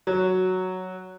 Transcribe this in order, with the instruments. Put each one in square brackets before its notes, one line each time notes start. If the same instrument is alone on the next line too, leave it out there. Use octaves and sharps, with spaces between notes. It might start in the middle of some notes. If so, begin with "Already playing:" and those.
[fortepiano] F#3